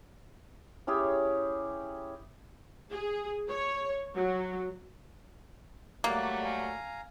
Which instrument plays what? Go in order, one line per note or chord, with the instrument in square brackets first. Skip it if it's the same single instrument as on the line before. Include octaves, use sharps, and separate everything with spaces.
[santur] C#4 E4 G4 G#4
[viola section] G#4
C#5
F#3
[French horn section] F#3 G3 A3 [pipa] A#3 [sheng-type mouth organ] D5 F#6
[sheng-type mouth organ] F5 G#5 A#5